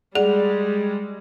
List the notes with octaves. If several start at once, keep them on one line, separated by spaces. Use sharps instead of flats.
G3 G#3 G#4 D5 F#5